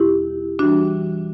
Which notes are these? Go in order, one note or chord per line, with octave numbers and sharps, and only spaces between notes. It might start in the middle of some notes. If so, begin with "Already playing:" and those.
Already playing: E2 B2 G3 E4 G4
E3 G3 D4 F#4